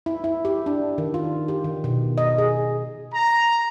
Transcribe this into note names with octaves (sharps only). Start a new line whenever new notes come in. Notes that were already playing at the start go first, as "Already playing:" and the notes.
E4
E4
G4
D4
D#3
F4
G4
D#3
B2
D#5
G#4
A#5